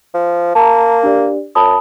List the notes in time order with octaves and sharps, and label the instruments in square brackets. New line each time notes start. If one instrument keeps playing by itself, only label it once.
[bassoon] F3
[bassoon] A#3 [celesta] A5 A#5
[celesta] D4 G4 D5
[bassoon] F#2 [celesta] A5 B5 D#6